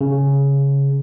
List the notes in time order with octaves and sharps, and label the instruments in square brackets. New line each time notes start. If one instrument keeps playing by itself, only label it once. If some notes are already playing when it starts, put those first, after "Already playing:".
[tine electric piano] C#3